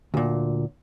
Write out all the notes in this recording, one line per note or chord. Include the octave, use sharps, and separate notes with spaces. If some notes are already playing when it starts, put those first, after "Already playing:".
D2 A#2